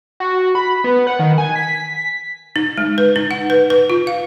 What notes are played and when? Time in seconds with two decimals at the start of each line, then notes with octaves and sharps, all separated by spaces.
0.20 F#4
0.55 B5
0.84 B3
1.07 F#5
1.19 D#3
1.38 G#5
1.55 B6
2.56 D#4
2.77 G#3
2.98 B4
3.16 D#4
3.31 F#5
3.50 B4
3.70 B4
3.90 F4
4.07 F5